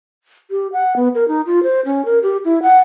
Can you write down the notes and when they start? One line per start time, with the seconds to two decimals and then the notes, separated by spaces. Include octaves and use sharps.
0.51 G4
0.73 F#5
0.96 B3
1.15 A#4
1.28 D#4
1.46 F4
1.63 C5
1.85 C#4
2.05 A#4
2.23 G4
2.45 E4
2.62 F#5